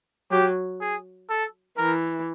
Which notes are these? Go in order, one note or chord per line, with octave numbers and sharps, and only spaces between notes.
F#3 G4
G#4
A4
E3 A#4